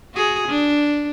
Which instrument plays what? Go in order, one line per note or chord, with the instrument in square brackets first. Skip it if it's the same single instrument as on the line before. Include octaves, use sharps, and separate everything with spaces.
[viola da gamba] F#4 G#4
D4